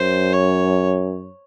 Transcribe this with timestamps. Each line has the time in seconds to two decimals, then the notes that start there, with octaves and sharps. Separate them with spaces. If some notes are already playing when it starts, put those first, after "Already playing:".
Already playing: F#2 C5
0.33 C#5